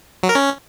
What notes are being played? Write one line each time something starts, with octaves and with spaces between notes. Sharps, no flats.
F#3
A#4
C#4